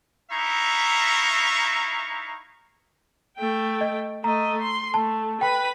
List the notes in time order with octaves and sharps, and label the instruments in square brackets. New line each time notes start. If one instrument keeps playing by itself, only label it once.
[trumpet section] D#4 E4 E5 F5 A#5 C#6
[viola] A3 G5
[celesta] D#5
[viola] A3 D#5 [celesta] A#5
[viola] C6
[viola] A3 [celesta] A5
[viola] B4 B5 [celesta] G5